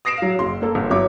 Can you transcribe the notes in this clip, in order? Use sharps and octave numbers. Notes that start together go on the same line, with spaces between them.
D#6 A#6 C7 D7 E7
F#3 F5
F#1 C6
A#3 A4
G1
F#3 B3 E4 C#5 D6